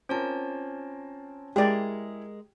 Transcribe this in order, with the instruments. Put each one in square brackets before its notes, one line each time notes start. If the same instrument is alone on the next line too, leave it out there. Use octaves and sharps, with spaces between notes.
[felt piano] C4 F4 A#4 [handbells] C#4 C#5 A5
[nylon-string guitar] G#3 A#4 [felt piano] E4 G#4 [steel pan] G4 D5